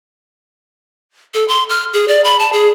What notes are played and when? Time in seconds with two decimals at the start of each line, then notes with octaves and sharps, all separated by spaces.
1.34 A4
1.48 C6
1.69 F6
1.93 G#4
2.08 D5
2.24 B5
2.39 A5
2.53 G#4